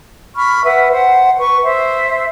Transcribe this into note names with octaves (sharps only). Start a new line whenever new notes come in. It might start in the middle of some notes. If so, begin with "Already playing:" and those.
B5 C#6 F6
B4 E5 F#5
C5 F#5
B4 C#6
C5 E5